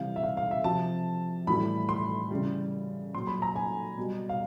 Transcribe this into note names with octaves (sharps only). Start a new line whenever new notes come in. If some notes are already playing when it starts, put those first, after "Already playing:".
Already playing: C3 E3 G3 F5
E5
F5
F5
E5
C3 F3 A5
A2 E3 G3 B5
C6
C#3 E3 G3
A#2 F#3 C6
B5
A#5
G#5
B2 G3
F5